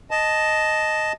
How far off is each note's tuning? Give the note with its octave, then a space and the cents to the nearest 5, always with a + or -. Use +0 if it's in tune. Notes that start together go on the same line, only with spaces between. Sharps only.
D#5 +0 A5 -5